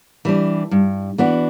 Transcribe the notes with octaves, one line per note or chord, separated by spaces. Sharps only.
E3 G3 D4
G2
E3 B3 D4 F#4